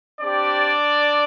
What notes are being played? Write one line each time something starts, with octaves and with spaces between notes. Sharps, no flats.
C4 D4 G4 D5